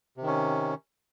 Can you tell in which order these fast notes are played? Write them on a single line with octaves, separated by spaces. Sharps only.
C3 D#3 C#4